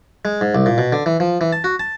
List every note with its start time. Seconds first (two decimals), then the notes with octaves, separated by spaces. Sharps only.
0.25 G#3
0.41 G#2
0.55 C2
0.66 A#2
0.78 B2
0.92 D3
1.06 E3
1.20 F3
1.41 E3
1.53 A5
1.64 F#4
1.80 A5